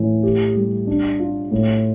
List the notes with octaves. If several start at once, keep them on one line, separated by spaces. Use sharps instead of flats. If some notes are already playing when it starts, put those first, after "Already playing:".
Already playing: A2 E3
G4
G3
D4
F4
A2